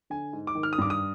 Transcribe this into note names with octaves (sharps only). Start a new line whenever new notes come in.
D3 G#5
G#2
D6
D#3
F6
D#6
G2 D6
D#6